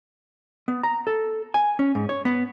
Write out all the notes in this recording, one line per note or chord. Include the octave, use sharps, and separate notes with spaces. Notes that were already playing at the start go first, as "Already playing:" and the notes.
B3
A#5
A4
G#5
C#4
G#2
C#5
B3